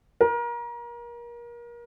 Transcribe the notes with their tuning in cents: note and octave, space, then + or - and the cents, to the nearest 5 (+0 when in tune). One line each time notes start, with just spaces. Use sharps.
A#4 +30